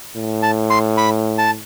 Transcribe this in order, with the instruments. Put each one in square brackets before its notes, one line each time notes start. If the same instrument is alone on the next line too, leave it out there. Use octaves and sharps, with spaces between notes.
[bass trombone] A2
[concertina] A5
C6
B5
A5